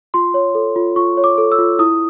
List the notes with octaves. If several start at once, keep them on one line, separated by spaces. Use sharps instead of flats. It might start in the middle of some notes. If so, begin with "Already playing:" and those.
F4 C6
C#5
A4
F4
F4 C#6
C#5
D6
A4
E6
F4
E4 D#6